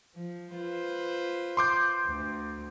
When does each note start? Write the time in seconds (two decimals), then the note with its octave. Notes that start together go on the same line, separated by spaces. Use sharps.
0.16 F3
0.55 F4 B4 C5
1.57 C6 D6 G6
2.07 D2